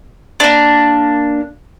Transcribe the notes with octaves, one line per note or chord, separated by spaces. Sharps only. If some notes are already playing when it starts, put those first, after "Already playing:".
A#3 D4